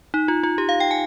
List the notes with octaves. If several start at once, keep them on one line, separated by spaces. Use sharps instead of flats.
D#4
F4
F4
G4
F5
G5
G#5